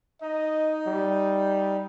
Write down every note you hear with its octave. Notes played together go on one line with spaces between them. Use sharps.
D#4 D#5
G3